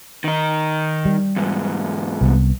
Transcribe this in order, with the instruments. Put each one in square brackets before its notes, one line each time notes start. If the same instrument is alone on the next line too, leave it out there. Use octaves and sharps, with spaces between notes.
[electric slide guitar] D#3 D#4
[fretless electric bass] G3
[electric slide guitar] E2 G#2
[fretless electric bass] C2 B3